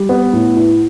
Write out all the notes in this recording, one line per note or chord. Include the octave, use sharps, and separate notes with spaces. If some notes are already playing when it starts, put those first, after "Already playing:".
Already playing: G3
B3
A2
E4